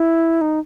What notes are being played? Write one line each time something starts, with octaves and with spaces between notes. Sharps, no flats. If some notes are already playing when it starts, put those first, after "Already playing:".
Already playing: E4
D#4